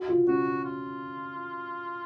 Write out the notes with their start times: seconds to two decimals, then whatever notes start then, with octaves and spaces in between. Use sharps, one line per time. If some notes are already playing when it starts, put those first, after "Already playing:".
Already playing: F#4
0.09 F4
0.27 C#4 F#4
0.65 F4